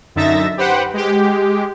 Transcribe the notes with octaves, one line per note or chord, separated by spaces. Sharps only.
F#2 D3 D#4 E5 A6 A#6
G4 B4 C5 F#5 G5
G#3 G4